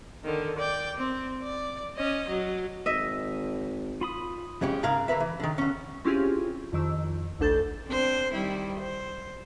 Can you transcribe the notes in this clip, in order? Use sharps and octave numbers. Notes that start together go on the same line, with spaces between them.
D3 D#3
D5 G5
C4
D5
C#4 D#5
F#3
G#1 D#5 E5
F4 B5 D#6
F2 G#3 C#4 G4
G#2 C#3 G#4 A#4 F5 A#5
D3 A#4 B4 E5
E3
D3 D#3
D3 C#4
C4 C#4 E4 F4 G4 G#4
F2 D#3 E6
A1 D2 D4 A4 G6 A6
C4 D4 C5
D#3 G3 E4
C5